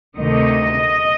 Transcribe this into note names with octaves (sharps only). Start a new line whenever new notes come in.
D2 C3 D#3 D#5